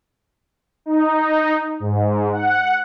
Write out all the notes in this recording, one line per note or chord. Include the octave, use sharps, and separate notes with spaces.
D#4
G#2
F#5